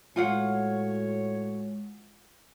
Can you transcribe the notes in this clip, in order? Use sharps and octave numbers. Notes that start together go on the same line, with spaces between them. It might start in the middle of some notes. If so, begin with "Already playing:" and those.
A2 G#3 F4 F#4 C#5 F5 F#5